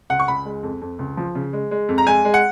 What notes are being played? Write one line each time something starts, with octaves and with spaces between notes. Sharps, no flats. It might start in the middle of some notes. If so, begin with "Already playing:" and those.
C#2 F#5
C#6
C#2 B5
G#3
F2
F2
C#2
F3
C#3
G#3
G#3
F2
A#5
G#3 G#5
G#3
F#5